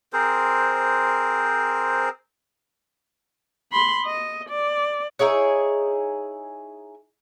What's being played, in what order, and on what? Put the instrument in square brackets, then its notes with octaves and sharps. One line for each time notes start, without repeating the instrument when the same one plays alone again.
[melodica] C4 G#4 A#4 C5
[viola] B5 C6
D#5
D5
[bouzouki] D#4 E4 G#4 C#5